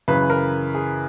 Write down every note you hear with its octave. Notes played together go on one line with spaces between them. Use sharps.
F#2 C#3 E3 B4
A#4
G#4